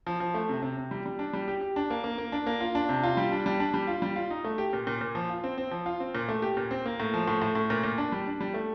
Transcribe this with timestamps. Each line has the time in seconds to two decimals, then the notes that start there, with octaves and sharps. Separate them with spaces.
0.06 F3
0.20 F3
0.34 A3
0.49 C3
0.63 C3
0.77 C3
0.91 G3
1.06 G3
1.19 D4
1.33 G3
1.48 G4
1.61 G4
1.76 D4
1.90 A#3
2.04 A#3
2.18 A#3
2.32 D4
2.47 A#3
2.60 F4
2.75 D4
2.89 C3
3.03 F4
3.17 G3
3.32 D4
3.46 G3
3.60 D4
3.74 G3
3.87 F4
4.02 G3
4.16 F4
4.30 D#4
4.44 A3
4.58 G4
4.73 A#2
4.87 A#2
5.01 A#2
5.15 F3
5.30 F4
5.44 C4
5.58 C4
5.71 F3
5.86 F4
6.00 C4
6.15 A#2
6.29 A3
6.42 G4
6.57 A#2
6.71 C4
6.86 A#3
7.00 A2
7.14 F3
7.28 A2
7.42 A2
7.55 A2
7.70 A#2
7.83 A#2
7.98 D4
8.12 G3
8.27 D4
8.41 G3
8.54 A3